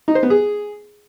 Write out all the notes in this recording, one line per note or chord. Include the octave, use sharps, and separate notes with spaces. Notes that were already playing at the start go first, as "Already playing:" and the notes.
D#4
C5
B3
G#4